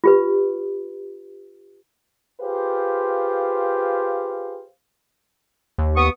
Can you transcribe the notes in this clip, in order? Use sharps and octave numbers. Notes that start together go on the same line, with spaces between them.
F4 G4 B4
F4 G4 G#4 B4 C5 F5
D#2
B3 C#6 D#6